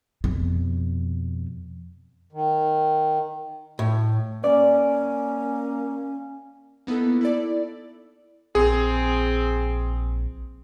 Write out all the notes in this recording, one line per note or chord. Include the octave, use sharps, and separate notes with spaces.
F2 B2
D#3
A2
A#3 C#4 D5
A#3 B3 D#4 E4 A4
E4 A4 D5
A#1 C4 G#4